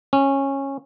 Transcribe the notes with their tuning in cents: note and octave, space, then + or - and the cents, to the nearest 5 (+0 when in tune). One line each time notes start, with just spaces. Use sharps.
C#4 -15